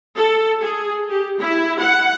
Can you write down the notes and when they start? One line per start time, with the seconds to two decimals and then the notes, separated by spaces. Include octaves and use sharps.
0.16 A4
0.60 G#4
1.09 G4
1.39 E4
1.80 F#5